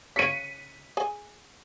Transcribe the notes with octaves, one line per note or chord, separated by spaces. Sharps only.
C#3 C#5 B6 C#7 D#7
G#4 G#5